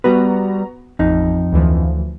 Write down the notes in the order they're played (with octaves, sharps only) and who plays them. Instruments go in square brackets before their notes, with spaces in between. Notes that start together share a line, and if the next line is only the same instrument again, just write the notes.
[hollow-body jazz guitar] G3 B4 [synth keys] B3 F#4 A#5
[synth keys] A1 [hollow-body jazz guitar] F2 D#4
[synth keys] D2 E3 F3